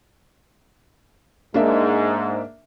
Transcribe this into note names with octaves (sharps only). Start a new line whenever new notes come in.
G#2 A#3 D4 E5